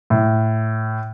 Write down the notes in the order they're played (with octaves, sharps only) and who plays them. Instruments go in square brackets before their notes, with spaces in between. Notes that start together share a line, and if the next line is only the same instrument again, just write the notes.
[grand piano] A2